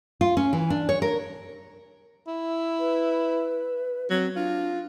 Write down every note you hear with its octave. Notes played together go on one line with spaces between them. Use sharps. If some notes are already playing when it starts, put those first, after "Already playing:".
F4
C#4
E3
D4
C#5
A#4
E4
B4
F#3 C4
D4 F4